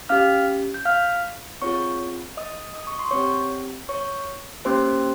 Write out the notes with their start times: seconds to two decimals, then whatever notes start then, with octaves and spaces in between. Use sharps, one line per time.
0.09 C#4 G4 F5 F6
0.74 G6
0.85 F5 F6
1.62 C4 F4 G#4 C#5 C#6
2.37 D#5 D#6
2.76 D#6
2.87 C#6
2.99 C6
3.11 C4 G4 C#5 C#6
3.89 C#5 C#6
4.65 A#3 C#4 G4 C5 C6